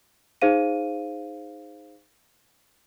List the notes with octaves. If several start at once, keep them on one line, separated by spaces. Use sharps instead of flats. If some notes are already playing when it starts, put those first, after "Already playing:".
D#4 G#4 C5 F5 D#7